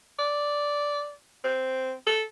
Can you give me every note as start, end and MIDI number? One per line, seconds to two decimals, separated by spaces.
0.19 1.11 74
1.44 1.92 60
2.06 2.23 69